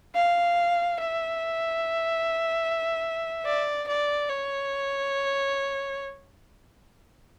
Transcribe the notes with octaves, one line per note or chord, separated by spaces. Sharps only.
F5
E5
D5
D5
C#5